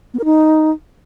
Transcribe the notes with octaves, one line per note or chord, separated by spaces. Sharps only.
B3
A#4
D#4